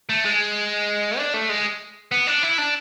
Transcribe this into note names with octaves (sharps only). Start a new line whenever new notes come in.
A3
G#3
D4
A3
G#3
B3
D4
E4
D4